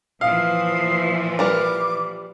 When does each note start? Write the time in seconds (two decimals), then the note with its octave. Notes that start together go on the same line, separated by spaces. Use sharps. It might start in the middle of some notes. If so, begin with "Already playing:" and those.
0.21 A#2 E3 F3 F5 D#6
1.39 G3 A#4 B4 D6